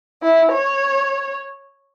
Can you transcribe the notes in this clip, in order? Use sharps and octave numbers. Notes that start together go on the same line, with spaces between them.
E4
C#5